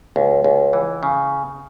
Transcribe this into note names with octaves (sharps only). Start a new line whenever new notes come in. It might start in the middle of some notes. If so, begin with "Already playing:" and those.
C#2
C#2
E3
C#3